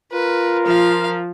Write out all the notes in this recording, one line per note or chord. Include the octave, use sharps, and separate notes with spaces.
F4 A#4 B4
F3 F5